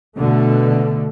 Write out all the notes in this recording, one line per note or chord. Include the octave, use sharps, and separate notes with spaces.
B2 D3 A3